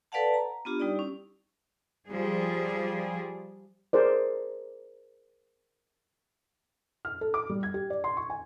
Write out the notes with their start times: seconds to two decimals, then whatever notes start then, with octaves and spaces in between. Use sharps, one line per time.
0.12 A4 B4 D5 F5 F#5 A5
0.34 A#5
0.65 B3 D4 F4 G4
0.80 G3 D#4 G4 D5
0.95 C#4 E4
2.09 F3 G3 G#4
3.93 G#4 A#4 C5 D5
7.05 F6
7.21 A4
7.34 D6
7.50 G3
7.63 G#6
7.74 G4
7.90 D5
8.04 C6
8.17 C#6
8.30 G#5